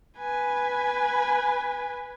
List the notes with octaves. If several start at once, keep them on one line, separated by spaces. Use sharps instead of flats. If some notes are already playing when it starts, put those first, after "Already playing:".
B4 G#5